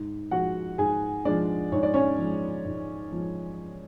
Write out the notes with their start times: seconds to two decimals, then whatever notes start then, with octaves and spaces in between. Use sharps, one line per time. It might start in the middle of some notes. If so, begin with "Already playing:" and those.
Already playing: G#2
0.31 F3 G#3 F#4 F#5
0.78 G#2 G#4 G#5
1.25 F3 G#3 D4 D5
1.72 G#2 C#5
1.83 D5
1.94 C#4 C#5
2.19 F3 G#3
2.65 G#2
3.12 F3 G#3